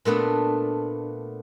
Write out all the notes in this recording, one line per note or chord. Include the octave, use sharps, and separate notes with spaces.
A#2 A3 B3 D4